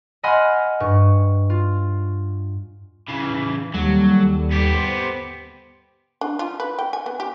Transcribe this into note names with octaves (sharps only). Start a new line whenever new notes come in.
D#5 F#5 G#5 B5 C6 F6
G2 C#6
F4
C#3 E3
D#2 F#3 G3 A4
B3 G4
C5
D4
F4
B4
G5
G#5
B3
G4